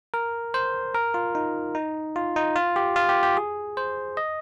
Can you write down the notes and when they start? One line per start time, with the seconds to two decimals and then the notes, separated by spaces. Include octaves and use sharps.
0.14 A#4
0.54 C5
0.94 A#4
1.14 F4
1.35 D#4
1.75 D#4
2.16 F4
2.36 D#4
2.56 F4
2.76 G4
2.96 F4
3.09 G4
3.23 G4
3.37 G#4
3.77 C5
4.17 D#5